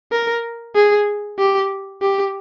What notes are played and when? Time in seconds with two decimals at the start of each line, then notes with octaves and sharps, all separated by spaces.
0.12 A#4
0.76 G#4
1.39 G4
2.02 G4